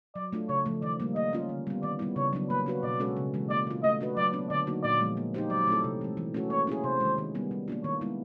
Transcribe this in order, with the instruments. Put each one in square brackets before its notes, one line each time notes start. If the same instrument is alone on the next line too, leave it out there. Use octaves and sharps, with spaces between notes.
[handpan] F#3 [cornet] D5
[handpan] A3 D4 F4
[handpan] C#3 [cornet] C#5
[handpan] F3 A3
[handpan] D#3 [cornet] D5
[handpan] G3 A#3
[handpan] A#3 [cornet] D#5
[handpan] C#4 F4
D3
G3 B3
[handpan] D#3 [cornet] D5
[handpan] G3 B3 E4
[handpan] C#3 [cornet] C#5
[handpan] F#3 B3 D4
[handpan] A#3 [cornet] B4
[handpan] D4 F#4 B4
[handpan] B2 [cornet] D5
[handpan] G#3 C#4 F#4 A4
C#3
E3 G#3
[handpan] A#3 [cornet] D5
[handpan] D4 F4
[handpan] A3 [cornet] D#5
[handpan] D4 F#4 B4
[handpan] F#3 [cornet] D5
[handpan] B3 D4
[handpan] D3 [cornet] D5
[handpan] F#3 A#3 D#4 F#4
[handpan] A#2 [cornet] D5
[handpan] F3 G#3 B3
A#3
D#4 G4 C5
[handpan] F#3 [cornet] D5
[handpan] A3 C4 E4 A4
C3
E3 G#3
E3
A3 C#4 F#4 A4
[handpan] A#3 [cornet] C#5
[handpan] C#4 E4 G#4
[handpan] C3 [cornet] C5
[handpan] D#3 G#3
D#3
G3 B3
G3
A#3 D4 F4
[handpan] D#3 [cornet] C#5
[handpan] G#3 B3 E4